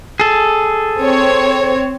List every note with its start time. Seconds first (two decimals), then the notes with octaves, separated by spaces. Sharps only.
0.20 G#4 A4
0.99 C4 C#5